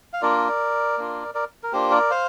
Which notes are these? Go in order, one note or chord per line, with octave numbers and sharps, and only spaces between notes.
F5
A#3 D4 F4 A#4 D5
A#3 D4 F4
A#4 D5
A#4
A#3 D4 F4 G4 C5
A#4 D5
C5 F5